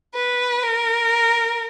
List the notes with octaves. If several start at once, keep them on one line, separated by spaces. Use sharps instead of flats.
B4
A#4